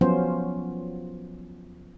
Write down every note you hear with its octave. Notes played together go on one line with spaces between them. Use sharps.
F3 F#3 B3 C#4 F4 C5